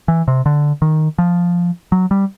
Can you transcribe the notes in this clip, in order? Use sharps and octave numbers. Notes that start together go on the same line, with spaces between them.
E3
C3
D3
D#3
F3
F#3
G3